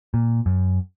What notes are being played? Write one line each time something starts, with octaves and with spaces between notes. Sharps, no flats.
A#2
F#2